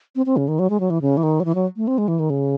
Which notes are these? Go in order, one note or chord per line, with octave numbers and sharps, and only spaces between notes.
C4
C4
C#3
D#3
F#3
G#3
F#3
E3
C#3
E3
D#3
F#3
E3
F#3
A3
C4
G#3
E3
D#3
C#3